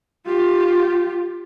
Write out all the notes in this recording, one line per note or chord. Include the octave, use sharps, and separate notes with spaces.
F4 G4